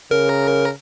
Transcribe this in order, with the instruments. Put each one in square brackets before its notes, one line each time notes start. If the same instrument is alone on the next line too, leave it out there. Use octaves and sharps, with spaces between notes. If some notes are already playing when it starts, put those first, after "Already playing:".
[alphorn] C#3 [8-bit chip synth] A#4